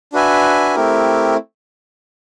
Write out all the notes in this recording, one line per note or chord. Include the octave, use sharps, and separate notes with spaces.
D4 F#4 B4 E5 G#5
A3 C4 E4 G4 A#4